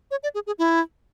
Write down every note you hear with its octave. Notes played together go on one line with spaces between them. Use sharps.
C#5
D5
G#4
G#4
E4